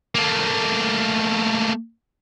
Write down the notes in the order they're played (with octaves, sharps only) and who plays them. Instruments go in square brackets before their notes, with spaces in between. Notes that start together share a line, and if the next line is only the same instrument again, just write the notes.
[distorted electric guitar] A3 A#3